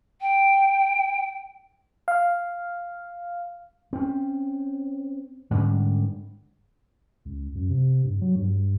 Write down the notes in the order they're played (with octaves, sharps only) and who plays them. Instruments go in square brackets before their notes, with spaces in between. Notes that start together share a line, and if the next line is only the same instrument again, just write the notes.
[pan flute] G5
[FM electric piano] F5
[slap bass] C4 C#4
G#2 D3 G3 C#4
[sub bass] C#2
F#2
C3
G2
F#3
G2